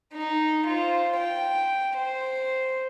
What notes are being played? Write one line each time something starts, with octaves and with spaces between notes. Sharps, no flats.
D#4
F4 C5
G5
C5